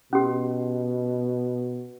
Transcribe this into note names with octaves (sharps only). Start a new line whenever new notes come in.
B2 C#4 G4